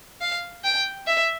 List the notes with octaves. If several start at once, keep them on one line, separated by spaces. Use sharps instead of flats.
F5
G5
E5